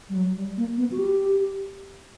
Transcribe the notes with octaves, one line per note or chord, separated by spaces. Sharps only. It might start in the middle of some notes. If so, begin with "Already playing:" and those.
G3
F#3
G3
A#3
B3
F#4
G4